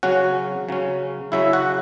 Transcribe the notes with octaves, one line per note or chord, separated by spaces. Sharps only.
C#3 F#3 C#4 F#4 F#5
C#3 F#3 C#4
C#3 F#3 C#4 E4 E5
F#4 F#5